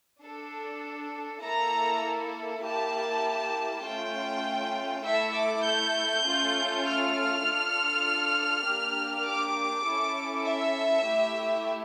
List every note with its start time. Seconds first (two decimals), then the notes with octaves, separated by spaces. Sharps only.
0.22 D4 A4
1.42 A#3 E4 A4 A#5
2.63 A#3 E4 G4 A5
3.83 A3 C#4 F4 G5
5.03 A3 E4 A4 E5
5.34 D6
5.64 G6
6.24 A3 C#4 F4 A4
6.84 F6
7.43 D4 F4 A4
8.64 A#3 D4 G4
9.24 D6
9.84 C#4 E4 A4
10.45 E5
11.05 A3 E4 G4